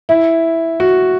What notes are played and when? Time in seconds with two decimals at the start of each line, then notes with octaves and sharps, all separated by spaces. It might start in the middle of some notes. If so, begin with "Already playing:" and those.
0.09 E4
0.80 F#4